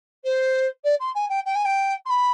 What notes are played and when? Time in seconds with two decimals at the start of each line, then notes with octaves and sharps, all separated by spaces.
0.24 C5
0.84 D5
0.99 C6
1.15 G#5
1.29 G5
1.45 G5
1.55 G#5
1.64 G5
2.05 C6
2.09 B5